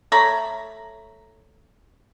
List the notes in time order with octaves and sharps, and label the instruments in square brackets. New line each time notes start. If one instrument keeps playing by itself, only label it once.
[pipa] A3 C#5 A#5 B5